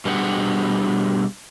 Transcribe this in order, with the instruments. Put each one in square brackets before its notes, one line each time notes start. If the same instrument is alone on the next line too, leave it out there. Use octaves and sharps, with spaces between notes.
[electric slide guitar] B2 G3 D4 G#4 C5 F#5